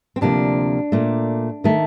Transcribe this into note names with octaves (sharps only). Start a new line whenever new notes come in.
C4
D2 C3 F3 A#3 D4
A#2 A3
D#3 A3